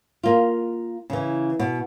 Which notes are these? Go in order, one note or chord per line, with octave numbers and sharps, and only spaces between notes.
A#3 F4
C#3 E3
B2